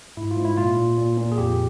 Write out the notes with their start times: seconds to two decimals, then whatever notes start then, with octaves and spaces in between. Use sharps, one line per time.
0.17 G#2 E4
0.31 F4
0.37 G#2
0.45 E4
0.57 A#2 F4
0.77 A#2
0.97 A#2
1.17 A#2
1.32 G#4
1.38 F2 G4